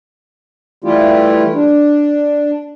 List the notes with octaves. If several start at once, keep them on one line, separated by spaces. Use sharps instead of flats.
E3 G3 A3 E4 F4 G4
D4